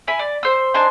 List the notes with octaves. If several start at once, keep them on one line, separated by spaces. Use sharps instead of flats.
E4 G#5 B5
D5
C5 E6
D4 D#4 C5 G#5